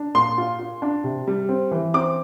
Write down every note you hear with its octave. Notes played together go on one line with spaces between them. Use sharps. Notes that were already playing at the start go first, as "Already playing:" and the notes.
Already playing: D4
A#2 C6
F4
F4
D4
C3
G3
C4
E3
C4 D6